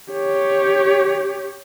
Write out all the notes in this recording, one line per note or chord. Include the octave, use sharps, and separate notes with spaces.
G4 C#5